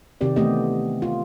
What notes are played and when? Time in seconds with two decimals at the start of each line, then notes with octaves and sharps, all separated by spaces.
0.21 C3 D#3 C4 G4 D5
0.36 E3 A3 B3 C4 G4 D#5
1.02 F4